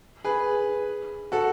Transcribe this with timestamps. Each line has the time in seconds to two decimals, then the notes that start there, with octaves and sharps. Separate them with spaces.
0.24 G#4 B4
1.32 F#4 A4